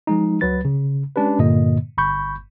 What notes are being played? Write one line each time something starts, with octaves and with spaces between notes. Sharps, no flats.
F3 G#3 D#4
C#2 F#3 B4 A6
C#3
G#3 C#4 D4 G4 B4
G2 A#2 D3 A#3 D#5
G1 B5 C#6 G6